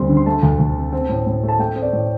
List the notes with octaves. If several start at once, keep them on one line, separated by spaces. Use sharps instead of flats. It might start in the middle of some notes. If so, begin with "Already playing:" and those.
Already playing: D2 G3 C4 C6
D3
C6
A3 A5
D2
D2
C3
C4
A2
A2
A3
A5
A3 G5
C4
D5
A2